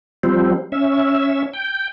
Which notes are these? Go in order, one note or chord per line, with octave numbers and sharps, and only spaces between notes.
F3 G3 C4
C#4 E5
G5